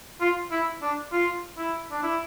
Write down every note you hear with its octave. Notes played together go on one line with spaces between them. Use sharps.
F4
E4
D4
F4
E4
D4
E4